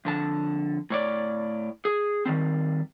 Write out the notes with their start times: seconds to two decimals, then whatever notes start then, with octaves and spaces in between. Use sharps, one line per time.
0.05 F2 D3 A5
0.90 A2 C#5 D5
1.85 G#4
2.25 D#3 E3 G3 C4